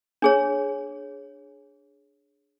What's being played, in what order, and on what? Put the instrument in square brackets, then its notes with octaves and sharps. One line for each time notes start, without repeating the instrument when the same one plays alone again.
[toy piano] D4 G#4 C#5